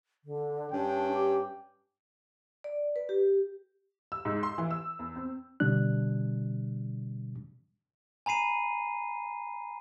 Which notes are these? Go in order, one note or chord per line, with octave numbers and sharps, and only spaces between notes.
D3
G2 C#4 D4 G5
G4
D5
B4
G4
E6
G#2
C6
E3
E6
E2
C4
B2 D3 G3 D4 F#6
G#5 A#5 B5 C7 D#7